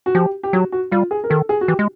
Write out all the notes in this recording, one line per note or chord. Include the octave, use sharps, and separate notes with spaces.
F#4
F3 G4
G4
F#3 F#4
F#4
G3 F4
G#4
A#4
D#3 A4
G#4
F#4
E3 G4
G#3